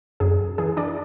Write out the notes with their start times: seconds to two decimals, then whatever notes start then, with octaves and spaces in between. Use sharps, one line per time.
0.20 F#2 G#4
0.58 E3 G#4
0.77 D4 D5